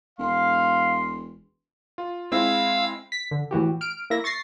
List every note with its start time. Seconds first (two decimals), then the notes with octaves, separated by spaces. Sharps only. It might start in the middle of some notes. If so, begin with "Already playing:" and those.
0.19 E1 F5 C6
1.98 F4
2.32 G#3 C4 E4 F5 E6
3.12 B6
3.31 D3
3.51 A2 E3 F#4 G4
3.81 F6 D7
4.10 A#3 E4 E5 A#6
4.24 C#6 A6 A#6 C7